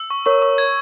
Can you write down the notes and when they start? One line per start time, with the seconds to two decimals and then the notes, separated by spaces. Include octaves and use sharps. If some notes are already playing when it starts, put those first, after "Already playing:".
Already playing: E6
0.10 C#6
0.26 A#4 C#5 C#6
0.42 C#6
0.58 G#6